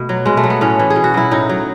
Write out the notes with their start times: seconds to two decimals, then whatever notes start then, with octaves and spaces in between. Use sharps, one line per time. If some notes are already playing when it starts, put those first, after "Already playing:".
Already playing: B2 A3
0.09 F#3
0.26 B2 G#3
0.37 A3
0.44 F#3
0.50 B3
0.61 A2 C#4
0.79 E3
0.90 G#4
0.96 B2
1.04 F#4
1.14 F#3 E4
1.31 A2 D#4
1.49 F#3